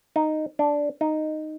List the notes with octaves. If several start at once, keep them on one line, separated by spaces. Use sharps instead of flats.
D#4
D4
D#4